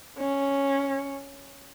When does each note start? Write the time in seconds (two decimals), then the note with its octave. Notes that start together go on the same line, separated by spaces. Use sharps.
0.19 C#4